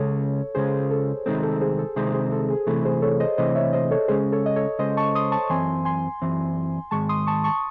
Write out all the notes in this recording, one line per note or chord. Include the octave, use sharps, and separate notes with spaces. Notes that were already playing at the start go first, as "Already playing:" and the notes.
Already playing: C#2 C#3 G#3 C#4 A4 C#5
C#2 C#3 G#3 C#4 G#4 C5
A4
C2 C3 D#3 G#3 C4 A4
A4
G#4 C5
A4
C2 C3 D#3 G#3 C4 G#4 C5
G#4 C5
A4
G#4
C3 E3 A3 A4
G#4 C5
A4 C#5
C5 D#5
C3 E3 A3 C5 D#5
C#5 E5
C5 D#5
A4 C#5
C#3 G#3 C#4 G#4 C5
A4 C#5
D#5
A4 C#5
C#3 G#3 C#4 C5 D#5
A5 C#6
C6 D#6
A5 C#6
F#2 E3 C4 G#5 C6
G#5 C6
F#2 E3 C4
G#2 D#3 G#3 A5 C#6
C6 D#6
A5 C#6
A5 C#6